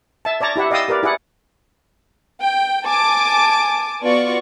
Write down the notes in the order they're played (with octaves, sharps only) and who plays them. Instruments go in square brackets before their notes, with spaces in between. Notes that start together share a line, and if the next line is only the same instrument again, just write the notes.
[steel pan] E5 A5
C#5 D5 A5 A#5
E4 G4 E5 F#5
D5 D#5 F5 G5 D#6 E6
G4 A#4 B4 D5
E4 G#4 D5 F#5
[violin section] G5
G#5 A5 D6
B3 F4 F#4 D5 C#6